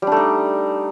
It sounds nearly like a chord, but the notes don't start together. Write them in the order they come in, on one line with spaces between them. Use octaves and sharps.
G3 D4 A3 D#4